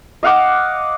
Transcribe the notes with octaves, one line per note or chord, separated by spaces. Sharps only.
D#5 F5 F#5 D6